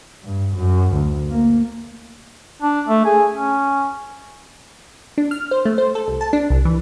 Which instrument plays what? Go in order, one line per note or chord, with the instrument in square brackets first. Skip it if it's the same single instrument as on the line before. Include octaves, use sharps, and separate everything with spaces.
[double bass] G2
F#2
D2
A#3
[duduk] D4
A3
G#4
C#4
[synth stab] D4
F6
C5
A3
C5
A4
C2
A5
D4
C2
E3